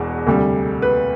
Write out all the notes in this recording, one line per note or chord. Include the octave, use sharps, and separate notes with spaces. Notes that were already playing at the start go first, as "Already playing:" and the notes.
Already playing: E1 E2 B2
D2 C3 G3
B4